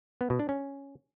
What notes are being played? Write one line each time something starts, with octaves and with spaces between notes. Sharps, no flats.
B3
B2
D4
C#4